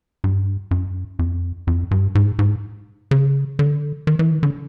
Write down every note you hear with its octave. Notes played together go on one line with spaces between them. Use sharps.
G2
F#2
F2
F2
G2
G#2
G#2
C#3
D3
D#3
E3
D#3
D3